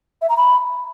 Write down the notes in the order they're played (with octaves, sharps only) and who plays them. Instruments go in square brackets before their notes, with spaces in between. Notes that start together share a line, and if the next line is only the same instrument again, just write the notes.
[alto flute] E5
A#5
B5